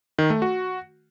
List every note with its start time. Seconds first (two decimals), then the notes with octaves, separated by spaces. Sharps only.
0.19 D#3
0.30 A3
0.42 F#4